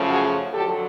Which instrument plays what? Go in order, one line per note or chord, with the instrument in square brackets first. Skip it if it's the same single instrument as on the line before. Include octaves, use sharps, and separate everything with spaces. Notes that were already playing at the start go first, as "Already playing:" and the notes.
Already playing: [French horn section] F#2 C#3 F3 A3
F#4 G#4
F2 D3 F#3 G4 A4